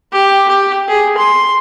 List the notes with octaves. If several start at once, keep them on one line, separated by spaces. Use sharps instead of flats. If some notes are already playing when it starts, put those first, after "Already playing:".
G4
G4
G#4
C6